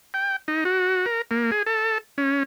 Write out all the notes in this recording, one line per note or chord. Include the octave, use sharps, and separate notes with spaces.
G5
D#4
F#4
A#4
A#3
G#4
A4
C#4